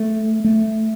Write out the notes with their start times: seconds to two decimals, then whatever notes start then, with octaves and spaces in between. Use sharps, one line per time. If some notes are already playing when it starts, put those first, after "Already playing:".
Already playing: A3
0.44 A3